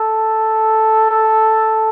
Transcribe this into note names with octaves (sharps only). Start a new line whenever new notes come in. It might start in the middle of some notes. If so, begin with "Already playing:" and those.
Already playing: A4
A4